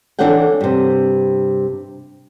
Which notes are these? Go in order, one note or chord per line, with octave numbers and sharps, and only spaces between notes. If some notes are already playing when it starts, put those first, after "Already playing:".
E3 D4 A4 C#5 F#5 G5
G2 C3